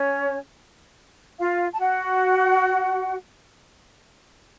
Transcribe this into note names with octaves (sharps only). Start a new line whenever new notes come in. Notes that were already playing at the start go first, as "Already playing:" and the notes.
Already playing: C#4 C#5
F4 F5
A5
F#4 F#5